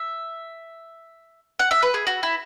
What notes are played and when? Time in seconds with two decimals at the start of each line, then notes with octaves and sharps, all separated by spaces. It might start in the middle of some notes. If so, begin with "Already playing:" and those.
Already playing: E5
1.59 F#5
1.71 E5
1.83 B4
1.94 G#4
2.07 F#4
2.23 E4